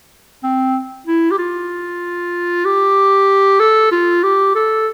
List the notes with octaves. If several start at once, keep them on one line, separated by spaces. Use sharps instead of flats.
C4
E4
G4
F4
G4
A4
F4
G4
A4